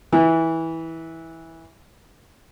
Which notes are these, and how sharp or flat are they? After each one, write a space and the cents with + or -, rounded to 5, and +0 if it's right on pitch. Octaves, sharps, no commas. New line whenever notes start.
E3 -15